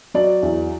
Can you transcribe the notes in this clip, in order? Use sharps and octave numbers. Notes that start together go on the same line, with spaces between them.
F#3 D5
E2